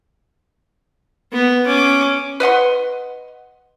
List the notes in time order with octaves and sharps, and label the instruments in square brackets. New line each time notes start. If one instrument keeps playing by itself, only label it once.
[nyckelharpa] B3
C#4 D6
[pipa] B4 D#5 F#5 C6